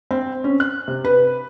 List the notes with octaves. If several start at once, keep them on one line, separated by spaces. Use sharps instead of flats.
C4
C#4
F#6
C3
B4